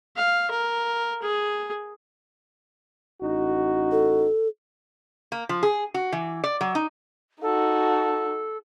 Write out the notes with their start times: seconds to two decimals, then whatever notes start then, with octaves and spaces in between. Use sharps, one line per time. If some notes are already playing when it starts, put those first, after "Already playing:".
0.16 F5
0.51 A#4
1.22 G#4
3.22 A1 D#4 F#4
3.92 A4
5.32 A#3
5.49 F3
5.63 G#4
5.94 F#4
6.12 E3
6.44 D5
6.61 F#3
6.75 D#4
7.42 D#4 F#4 A4